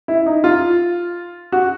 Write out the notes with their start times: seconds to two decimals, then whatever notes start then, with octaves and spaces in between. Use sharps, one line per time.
0.08 E4
0.26 D#4
0.44 F4
1.52 F#4